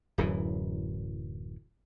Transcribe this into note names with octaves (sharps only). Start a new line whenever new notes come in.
D1 F#2 E3